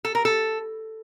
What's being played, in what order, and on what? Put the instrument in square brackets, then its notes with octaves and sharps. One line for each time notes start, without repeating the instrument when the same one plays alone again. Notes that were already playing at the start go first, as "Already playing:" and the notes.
[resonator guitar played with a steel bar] A4
A#4
A4